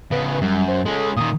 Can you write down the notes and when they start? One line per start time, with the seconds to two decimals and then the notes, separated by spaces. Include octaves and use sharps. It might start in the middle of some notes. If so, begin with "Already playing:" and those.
0.11 C#3 B3 B4
0.41 F#2 G3
0.68 C5
0.85 G#3 C#4 A4
1.17 A#2 D#3 D#6